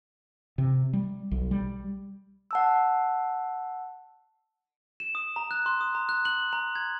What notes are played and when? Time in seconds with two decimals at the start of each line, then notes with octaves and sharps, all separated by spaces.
0.58 C3
0.93 G3
1.32 B1
1.51 G3
2.51 F#5 A5 E6
5.00 E7
5.15 D#6
5.36 A#5
5.51 F#6
5.66 C6
5.81 D#6
5.95 A#5
6.09 F#6
6.25 F#7
6.53 A#5
6.75 G#6